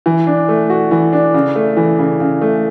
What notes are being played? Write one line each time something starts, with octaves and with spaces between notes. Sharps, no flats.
E3
D4
A3
F#4
E3
D4
C#3
A3
E3
C#3
C#3
A3